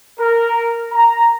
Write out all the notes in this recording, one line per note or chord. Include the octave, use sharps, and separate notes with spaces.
A#4
A#5